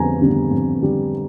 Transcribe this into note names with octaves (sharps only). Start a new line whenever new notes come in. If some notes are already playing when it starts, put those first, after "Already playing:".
Already playing: F2 D3 G3 B3 G#5 A#5
D3 G3 B3
F2
D3 G3